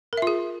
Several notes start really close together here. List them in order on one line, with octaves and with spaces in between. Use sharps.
A#4 E5 F4 G#4